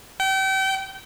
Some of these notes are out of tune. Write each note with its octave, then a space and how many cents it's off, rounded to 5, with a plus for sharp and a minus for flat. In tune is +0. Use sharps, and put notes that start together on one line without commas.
G5 -35